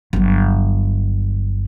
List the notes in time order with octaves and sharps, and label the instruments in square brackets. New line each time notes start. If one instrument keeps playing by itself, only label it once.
[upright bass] G1 F#3